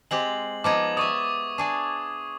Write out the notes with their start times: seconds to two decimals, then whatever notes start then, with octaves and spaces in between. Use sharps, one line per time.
0.11 G#3 C4 G4 F#7
0.64 F3 B3 D#4 D6 G#6
0.97 D5 E5 C#6 D#6
1.58 D4 G#4 D5